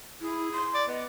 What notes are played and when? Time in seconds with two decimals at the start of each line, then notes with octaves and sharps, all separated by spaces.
0.21 E4 G#4
0.52 C6
0.74 D5
0.88 B3 D#5